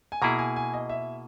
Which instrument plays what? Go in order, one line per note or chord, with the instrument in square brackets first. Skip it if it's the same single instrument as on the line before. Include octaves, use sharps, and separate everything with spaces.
[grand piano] G#5
[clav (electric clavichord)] B2 A#3 E4 G#4 [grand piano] A#5
[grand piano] G#5
G#5
D#5
E5